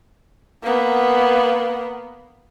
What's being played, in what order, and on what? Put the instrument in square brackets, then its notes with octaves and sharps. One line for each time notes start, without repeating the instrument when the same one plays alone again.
[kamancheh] A#3 B3